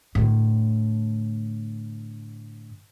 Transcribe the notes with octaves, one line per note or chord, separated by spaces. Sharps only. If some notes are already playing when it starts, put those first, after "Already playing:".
A2 D3